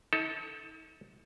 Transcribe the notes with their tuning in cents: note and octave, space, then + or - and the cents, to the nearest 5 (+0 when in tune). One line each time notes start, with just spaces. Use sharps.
D#4 +45 A4 +0